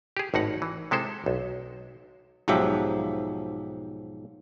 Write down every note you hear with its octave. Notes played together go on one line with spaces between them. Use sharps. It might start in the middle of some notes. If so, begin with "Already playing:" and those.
G4 G#4
G#1 A2 D#4 F#5
E3
C3 G#3 E4 A4 C5
B1
B1 G#2 F3 F#3 G4 E5